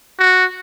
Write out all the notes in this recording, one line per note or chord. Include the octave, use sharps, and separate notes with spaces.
F#4